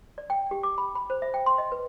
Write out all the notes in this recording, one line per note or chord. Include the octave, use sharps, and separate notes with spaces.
D5
G5
G4
D6
B5
B5
C5
E5
G5
C6
D#5
B4